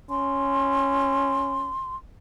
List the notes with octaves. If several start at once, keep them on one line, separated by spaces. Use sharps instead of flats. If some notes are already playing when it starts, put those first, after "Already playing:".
C#4 C6